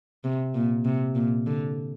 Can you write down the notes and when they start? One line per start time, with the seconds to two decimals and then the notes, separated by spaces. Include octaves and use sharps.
0.24 C3
0.54 A#2
0.85 C3
1.15 A#2
1.47 D3